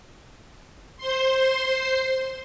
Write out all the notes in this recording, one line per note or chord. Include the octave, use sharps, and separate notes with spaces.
C5 C6